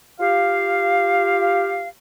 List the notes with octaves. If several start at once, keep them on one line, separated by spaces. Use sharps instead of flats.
F4 G4 F5